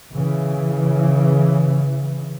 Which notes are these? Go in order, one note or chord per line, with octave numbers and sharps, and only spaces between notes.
C#3 E3